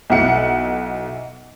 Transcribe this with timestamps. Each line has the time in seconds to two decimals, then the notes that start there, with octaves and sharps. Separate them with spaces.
0.10 B1 E4 F#5 C#7